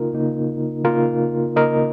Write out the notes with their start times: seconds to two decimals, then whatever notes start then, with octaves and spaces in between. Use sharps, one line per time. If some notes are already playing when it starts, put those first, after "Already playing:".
Already playing: C#3 A#3 D#4 F4 A#4
0.13 C#3 A#3 D#4
0.84 C#3 A#3 D#4 F4 A#4
1.56 C#3 A#3 D#4 A#4 D#5